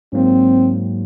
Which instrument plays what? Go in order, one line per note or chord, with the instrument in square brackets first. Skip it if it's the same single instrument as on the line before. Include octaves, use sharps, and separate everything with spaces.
[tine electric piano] G#2 F#3 A#3 [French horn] C4